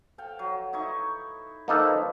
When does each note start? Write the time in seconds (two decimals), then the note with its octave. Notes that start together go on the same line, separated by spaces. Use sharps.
0.18 A4 F5 G5
0.39 F#3
0.73 D#4 E4 C#6
1.68 F3 A#3 D#4 A4 B4